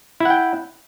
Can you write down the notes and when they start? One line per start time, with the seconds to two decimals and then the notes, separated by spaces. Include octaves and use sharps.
0.20 E4
0.25 F#5
0.30 G5